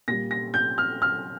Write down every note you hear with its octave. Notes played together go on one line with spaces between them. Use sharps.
A#2 G3 A#6
A#6
G6
F6
F6